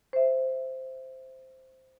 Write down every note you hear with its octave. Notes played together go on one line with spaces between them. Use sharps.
C5 E5